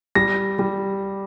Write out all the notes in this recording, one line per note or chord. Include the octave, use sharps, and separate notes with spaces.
G3 A#6
G3